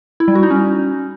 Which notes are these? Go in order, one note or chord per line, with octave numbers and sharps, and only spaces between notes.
E4
G3
F#4
D#4
C#4